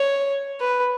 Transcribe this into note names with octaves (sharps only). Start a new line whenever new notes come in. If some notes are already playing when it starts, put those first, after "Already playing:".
Already playing: C#5
B4